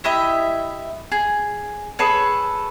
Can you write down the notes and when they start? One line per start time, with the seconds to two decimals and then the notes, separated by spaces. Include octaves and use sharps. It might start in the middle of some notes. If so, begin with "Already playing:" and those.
0.04 E4 G4 D#5 E5
1.12 G#4
1.99 G#4 A4 B4 C#5